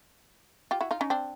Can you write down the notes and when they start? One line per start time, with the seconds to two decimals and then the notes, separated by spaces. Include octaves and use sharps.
0.71 F4 G4
0.81 E4 F#4
0.91 D#4 F4
1.01 C#4 D#4
1.10 C4 D4